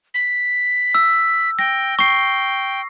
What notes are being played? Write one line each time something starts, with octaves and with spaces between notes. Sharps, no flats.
B6
E6
G5 A#6
G5 C#6 C7